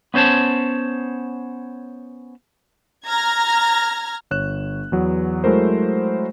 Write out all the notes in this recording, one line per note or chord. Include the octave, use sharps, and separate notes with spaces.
B3 C#4 C5 C#5 A5
A#5 F6 G#6 A#6
G1 C#5 F#6 E7
E2 F#3 B3
F#3 G#3 A3 E4 A#4 C5